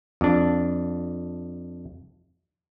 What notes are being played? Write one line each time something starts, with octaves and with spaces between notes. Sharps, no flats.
F2 D4